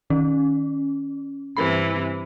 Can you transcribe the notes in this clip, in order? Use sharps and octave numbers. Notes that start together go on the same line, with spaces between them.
D#3 C#4
G2 C3 E3 B5